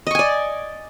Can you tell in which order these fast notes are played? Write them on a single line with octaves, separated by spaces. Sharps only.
D#5 C#6 G#5 D5